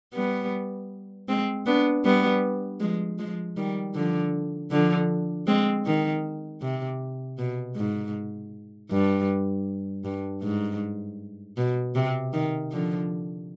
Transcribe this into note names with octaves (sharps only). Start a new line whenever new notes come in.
G3 B3
G#3 C4
B3 D4
G3 B3
F3 G#3
F3 G#3
D#3 G3
D3 F3
D3 F3
G#3 C4
D#3
C3
B2
G#2
G2
G2
G#2
B2
C3
D#3
D3 F3